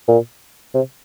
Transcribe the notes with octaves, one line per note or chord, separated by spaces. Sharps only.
A#2
C3